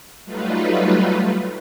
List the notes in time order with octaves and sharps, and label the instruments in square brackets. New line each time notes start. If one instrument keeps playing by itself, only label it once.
[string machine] F#3 G3 A3 D#4 F4 B4